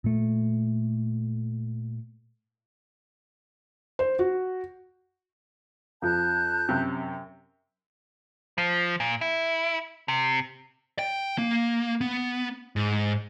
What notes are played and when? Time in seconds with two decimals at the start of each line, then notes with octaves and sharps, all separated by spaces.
0.04 A#2 A3
3.99 C5
4.19 F#4
6.02 F2 F3 A5 F#6 G6
6.69 F#2 C3
8.58 F3
9.00 A#2
9.21 E4
10.08 C3
10.99 G5
11.38 A#3
12.01 B3
12.76 G#2